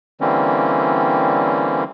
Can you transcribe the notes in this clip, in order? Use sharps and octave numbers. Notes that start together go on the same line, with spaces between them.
D3 E3 G3 A#3 C4 C#4